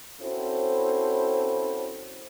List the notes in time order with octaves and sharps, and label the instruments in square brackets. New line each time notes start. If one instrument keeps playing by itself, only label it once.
[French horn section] C4 C#4 E4 F#4 A4 C5